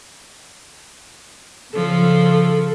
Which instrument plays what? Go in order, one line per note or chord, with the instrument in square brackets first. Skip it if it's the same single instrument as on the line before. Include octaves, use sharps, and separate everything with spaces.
[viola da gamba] C#3 F3 [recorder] A4